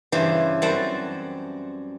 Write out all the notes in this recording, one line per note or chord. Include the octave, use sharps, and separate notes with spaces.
G2 C#3 E3 G4 C5
F#2 G3 C4 C5 F#5 A5